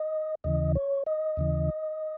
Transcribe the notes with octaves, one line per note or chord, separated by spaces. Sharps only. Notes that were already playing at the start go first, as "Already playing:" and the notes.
Already playing: D#5
D#2 C#3 E3 D#5
C#5
D#5
D#2 C#3 E3